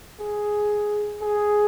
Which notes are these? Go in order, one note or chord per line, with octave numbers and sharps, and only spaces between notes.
G#4
G#4